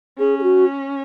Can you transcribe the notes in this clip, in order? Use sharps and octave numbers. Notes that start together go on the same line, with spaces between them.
C#4 G#4
G#4
F#4